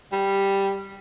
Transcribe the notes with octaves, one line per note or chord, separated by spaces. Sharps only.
G3